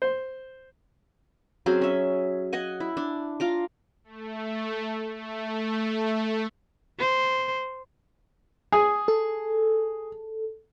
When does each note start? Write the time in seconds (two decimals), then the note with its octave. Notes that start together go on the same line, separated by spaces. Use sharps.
0.02 C5
1.66 F#3 C4 C#4 G#4
1.82 C#4 E5
2.53 D#5 F#5 G#5
2.80 E4
2.97 D4
3.40 F4 A#5 D6
4.04 A3
5.16 A3
6.99 C5
8.72 G#4
9.08 A4